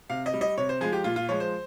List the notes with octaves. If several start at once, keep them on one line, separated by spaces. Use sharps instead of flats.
C3 F5
D#5
G3
D#5
C3 C#5
C5
F3 G#3 G#4
G4
A#2 F4
F4
F3 G#3 C#5
C5